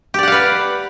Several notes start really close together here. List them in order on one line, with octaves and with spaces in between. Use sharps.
G4 D5 F#5 F5 B4